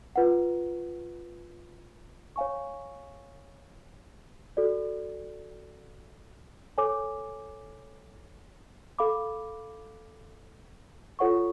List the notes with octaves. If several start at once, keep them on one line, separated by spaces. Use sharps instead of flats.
F4 B4 F#5
C#5 F5 G#5 C#6
F#4 A4 D5
A4 C#5 G#5 D6
A4 F5 B5 D6
F4 A4 C#5 F#5 C#6